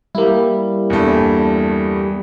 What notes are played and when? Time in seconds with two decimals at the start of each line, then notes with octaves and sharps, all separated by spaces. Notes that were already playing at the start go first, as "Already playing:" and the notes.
0.15 G3 A#3 E4
0.90 E2 G2 A3